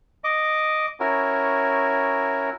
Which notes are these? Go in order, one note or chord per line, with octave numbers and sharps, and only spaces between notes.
D#5 D6
C#4 E4 F#4 A#4